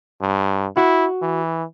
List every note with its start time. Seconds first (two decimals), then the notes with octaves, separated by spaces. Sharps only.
0.21 G2
0.77 E4 F#4
1.22 E3